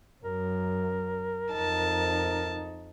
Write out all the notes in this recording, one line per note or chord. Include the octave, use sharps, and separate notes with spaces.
F#2 A#4
F2 D#4 A5